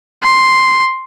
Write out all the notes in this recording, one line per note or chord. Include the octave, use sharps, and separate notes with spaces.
C6